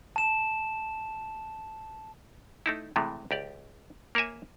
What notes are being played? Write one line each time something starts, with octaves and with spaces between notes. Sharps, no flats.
A5 E7
A3 D#4 E4
A2 C3 E3 G#3 A3
C#2 G4 D5
A#3 A#4 C#5 E5 G#5